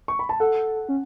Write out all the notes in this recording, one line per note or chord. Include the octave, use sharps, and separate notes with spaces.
C#6
B5
A5
A4 F#5
C#4